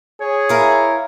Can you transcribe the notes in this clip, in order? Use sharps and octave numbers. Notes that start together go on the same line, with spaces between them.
G#4 C#5
E3 E4 A#4 F5